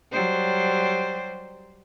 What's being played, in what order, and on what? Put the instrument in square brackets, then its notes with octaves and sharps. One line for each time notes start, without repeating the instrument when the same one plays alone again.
[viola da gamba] F#3 G3 C5